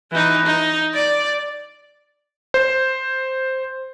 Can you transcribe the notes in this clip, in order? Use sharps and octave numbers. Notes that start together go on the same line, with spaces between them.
E3 D#4
D#4
D5
C5